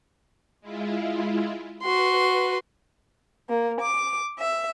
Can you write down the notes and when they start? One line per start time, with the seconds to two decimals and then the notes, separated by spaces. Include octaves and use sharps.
0.61 G#3 E4 F4
1.82 F#4 B4 C6
3.49 A#3
3.80 D6
4.38 E5